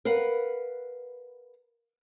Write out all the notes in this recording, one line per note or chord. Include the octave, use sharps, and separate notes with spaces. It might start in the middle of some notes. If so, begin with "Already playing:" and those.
A#4 B4 F5 F#5